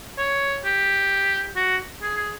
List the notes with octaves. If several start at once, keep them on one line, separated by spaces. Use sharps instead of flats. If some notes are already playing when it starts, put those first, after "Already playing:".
C#5
G4
F#4
G#4
G#4